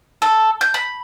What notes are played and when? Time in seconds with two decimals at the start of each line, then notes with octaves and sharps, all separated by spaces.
0.22 A4
0.61 G6
0.74 B5